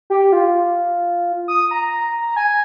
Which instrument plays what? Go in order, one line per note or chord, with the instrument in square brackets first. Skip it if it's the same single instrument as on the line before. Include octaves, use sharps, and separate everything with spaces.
[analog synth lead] G4
F4
D#6
A#5
G#5